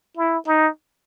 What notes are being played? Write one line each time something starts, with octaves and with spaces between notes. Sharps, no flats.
E4
D#4